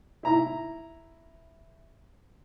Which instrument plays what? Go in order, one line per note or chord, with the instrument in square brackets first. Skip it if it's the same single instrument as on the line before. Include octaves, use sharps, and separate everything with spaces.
[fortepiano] E4 A#5